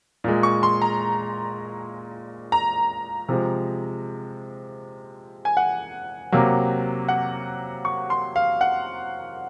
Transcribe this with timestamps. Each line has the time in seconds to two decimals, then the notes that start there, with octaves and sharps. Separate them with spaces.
0.24 A#2 G#3
0.43 C#6
0.63 C6
0.82 A#5
2.52 A#5
3.29 C3 F3 G#3
5.45 G#5
5.57 F#5
6.32 C3 F#3 A#3
7.08 F#5
7.85 C#6
8.10 C6
8.36 F5
8.61 F#5